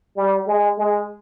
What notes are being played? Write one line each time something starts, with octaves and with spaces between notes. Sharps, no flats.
G3
G#3
G#3